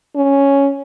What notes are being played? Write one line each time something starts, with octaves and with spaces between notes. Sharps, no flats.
C#4